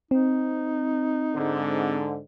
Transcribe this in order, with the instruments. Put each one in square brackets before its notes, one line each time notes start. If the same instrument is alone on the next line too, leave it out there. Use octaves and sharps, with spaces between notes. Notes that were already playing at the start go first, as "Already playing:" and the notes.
[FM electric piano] C4 [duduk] D#4
[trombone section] G#2 D3